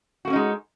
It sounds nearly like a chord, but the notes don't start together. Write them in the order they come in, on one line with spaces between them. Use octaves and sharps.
F#4 A#3 C#4 D#4 G#3